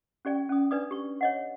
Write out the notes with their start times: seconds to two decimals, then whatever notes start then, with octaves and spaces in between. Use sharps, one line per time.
0.25 C#4 G4 D5 G5
0.49 C#4 D#6
0.71 D4 B4 D5 D#6
0.91 G4 C#6
1.21 C#5 D#5 F#5